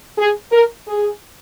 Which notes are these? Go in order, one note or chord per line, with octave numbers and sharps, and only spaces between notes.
G#4
A#4
G#4